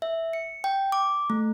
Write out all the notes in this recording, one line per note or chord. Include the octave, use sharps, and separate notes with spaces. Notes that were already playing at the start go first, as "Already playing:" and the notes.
E5
C#7
G5
D6
A3